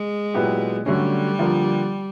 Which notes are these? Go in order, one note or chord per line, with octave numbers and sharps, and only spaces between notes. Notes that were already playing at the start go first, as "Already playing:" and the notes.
Already playing: G#3
A#2 F#3 B3 E4 G4
D3 F#3 G3 A3 C#4
D3 F3 A#3